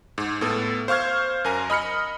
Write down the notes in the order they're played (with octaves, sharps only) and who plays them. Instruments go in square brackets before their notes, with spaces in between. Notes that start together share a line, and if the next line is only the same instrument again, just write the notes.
[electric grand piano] G#2
A2 B3 A4
C5 F5 C#6 F6 G#6
F#2 A#4 G#5 A#5
D#5 B5 F6 C#7